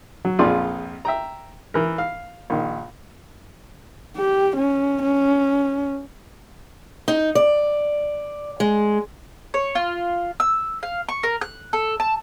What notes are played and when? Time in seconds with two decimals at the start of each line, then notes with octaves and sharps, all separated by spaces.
0.25 F#3
0.39 A#1 F2 F4 G#4 D5 C6
1.05 E5 G5 A#5
1.74 E3 A#4
1.98 F5
2.50 A#1 D#3
4.17 G4
4.57 C#4
5.02 C#4
7.08 D#4
7.35 D5
8.60 G#3
9.54 C#5
9.75 F4
10.40 E6
10.83 F5
11.09 C#6
11.23 A#4
11.42 F#6
11.73 A4
12.00 A5